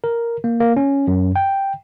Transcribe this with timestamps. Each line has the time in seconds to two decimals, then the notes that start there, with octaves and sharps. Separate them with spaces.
0.04 A#4
0.44 A#3
0.60 A#3
0.76 C#4
1.08 F#2
1.36 G5